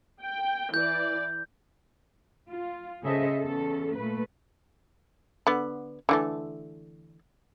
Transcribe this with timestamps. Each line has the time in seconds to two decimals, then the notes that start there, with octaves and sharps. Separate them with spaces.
0.22 G5
0.74 E3 D5 G6
2.49 F4
3.02 C#3 G#4 A4 C5 D#5 E5
3.39 E2 C#4 A4
3.95 A#2 A3 B4
5.47 D3 B3
6.09 D3 E3 A3